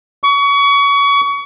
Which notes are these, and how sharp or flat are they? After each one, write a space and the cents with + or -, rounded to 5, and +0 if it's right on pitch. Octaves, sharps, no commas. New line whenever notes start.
C#6 +30